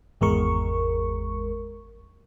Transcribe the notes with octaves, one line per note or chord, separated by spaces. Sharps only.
G#1 E2 G#3 A#4 C#6